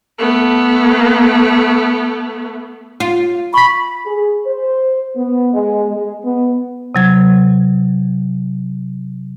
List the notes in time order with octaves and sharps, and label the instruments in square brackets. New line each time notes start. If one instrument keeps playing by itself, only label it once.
[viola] A3 B3
[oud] F4
[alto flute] B5 [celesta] C#6 B6
[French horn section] G#4
C5
B3
G#3
G#3
B3
[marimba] C3 F#3 G#6